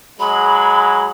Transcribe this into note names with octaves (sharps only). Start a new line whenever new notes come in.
F#3 G#3 B5